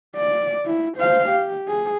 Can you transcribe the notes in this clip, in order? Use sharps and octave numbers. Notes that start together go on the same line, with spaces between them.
D5
E4
C5 F5
G4
G#4